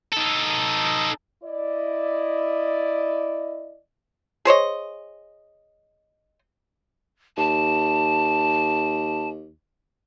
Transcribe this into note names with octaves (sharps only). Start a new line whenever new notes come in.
D#4 A4
E4 D5 D#5
G#4 C5 C#5 D#5
D#2 A5